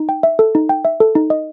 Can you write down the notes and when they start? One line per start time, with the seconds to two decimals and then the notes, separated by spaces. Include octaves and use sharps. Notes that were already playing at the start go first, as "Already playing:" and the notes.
Already playing: D#4
0.09 G5
0.23 E5
0.39 A4
0.55 D#4
0.69 G5
0.85 E5
1.00 A4
1.15 D#4
1.30 D#5